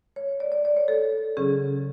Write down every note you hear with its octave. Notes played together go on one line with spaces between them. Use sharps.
C#5
D5
D5
D5
C#5
A4
C#3 F#3 C#4 G#4